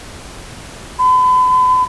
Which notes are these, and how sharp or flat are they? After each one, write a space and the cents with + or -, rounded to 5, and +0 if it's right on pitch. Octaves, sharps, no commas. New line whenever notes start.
B5 +40